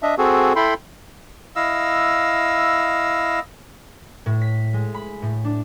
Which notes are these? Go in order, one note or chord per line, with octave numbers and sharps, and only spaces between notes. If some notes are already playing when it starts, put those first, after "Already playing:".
D4 D#5 E5
C4 F#4 G#4 A4
E4 A4 G5 B5 C6
E4 D#5 F5 E6
A2
B6
G#3
B5
A2
D4